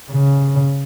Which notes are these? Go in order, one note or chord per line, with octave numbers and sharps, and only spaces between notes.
C#3